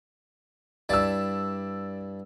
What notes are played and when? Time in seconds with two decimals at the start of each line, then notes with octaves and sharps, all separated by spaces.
0.89 G2 E4 D5 A5 E6